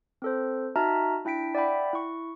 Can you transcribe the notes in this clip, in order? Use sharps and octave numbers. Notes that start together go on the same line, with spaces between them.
C4 A4 C5
D#4 F#4 E5 A5 A#5 F6
D4 E4 G5 B6 D7
D5 E5 F#5 G5 B5
E4 C#6